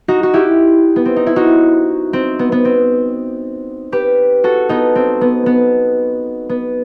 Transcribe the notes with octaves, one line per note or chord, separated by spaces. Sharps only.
D#4 F#4
F#4
E4 G4
B3
C4
D#4
E4
D#4 F#4
C4
B3
B3
C4
G4 B4
F#4 A4
B3 D#4
C4
B3
B3
B3